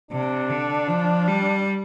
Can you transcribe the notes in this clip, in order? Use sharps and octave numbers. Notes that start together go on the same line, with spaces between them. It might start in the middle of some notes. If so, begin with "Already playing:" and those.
C3 D4
D3
F3
G3